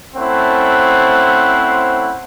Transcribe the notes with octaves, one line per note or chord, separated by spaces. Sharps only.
A3 C4 C#4 E4 C5 F#5